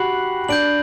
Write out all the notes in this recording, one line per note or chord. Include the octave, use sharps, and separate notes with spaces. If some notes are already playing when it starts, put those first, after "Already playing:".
Already playing: F#4 G4 B5 F#6 C7 F#7
D4 G6 D7 F#7